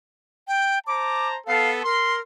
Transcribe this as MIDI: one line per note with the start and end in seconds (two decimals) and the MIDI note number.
0.48 0.79 79
0.87 1.37 72
0.87 1.37 81
0.87 1.37 82
0.87 1.28 86
1.47 1.79 59
1.47 1.79 69
1.47 1.70 77
1.84 2.21 70
1.84 2.19 84